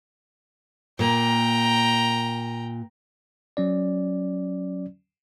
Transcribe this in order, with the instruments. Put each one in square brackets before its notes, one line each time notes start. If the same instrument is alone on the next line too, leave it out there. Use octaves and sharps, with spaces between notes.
[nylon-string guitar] A#2 A#3 [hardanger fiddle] G5 A#5
[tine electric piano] F#3 C#4 D5